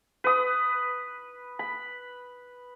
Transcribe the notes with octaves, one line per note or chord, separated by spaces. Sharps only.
B4 D#6
B5